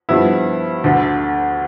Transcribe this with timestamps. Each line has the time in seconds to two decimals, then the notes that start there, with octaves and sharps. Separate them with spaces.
0.09 G2 F3 B3 E4
0.84 D2 D3 A3